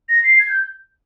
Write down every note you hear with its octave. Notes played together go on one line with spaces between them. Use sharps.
A#6
C7
G#6
G6